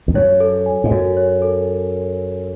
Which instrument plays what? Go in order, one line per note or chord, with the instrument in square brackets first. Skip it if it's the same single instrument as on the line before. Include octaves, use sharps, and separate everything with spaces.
[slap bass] E2
[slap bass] F#2 [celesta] C#5
[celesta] A4
G#5
[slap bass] G#2
[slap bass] F#2 [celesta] F#4
[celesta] C#5
A4